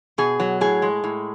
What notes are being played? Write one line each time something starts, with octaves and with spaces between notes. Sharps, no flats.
B2 G#4
F#3
A2 G#4
G#3
A2